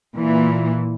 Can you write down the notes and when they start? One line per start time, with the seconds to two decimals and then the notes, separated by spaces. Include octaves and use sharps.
0.15 A#2 E3